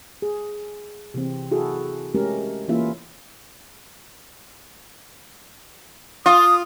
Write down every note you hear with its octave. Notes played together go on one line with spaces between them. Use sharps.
G#4
C3 E3 C4
E4 F#4 G#4 A4
G#3 A3 C#4 G4 A#4
E3 A#3 C#4 E4 F4 E5
F4 D#6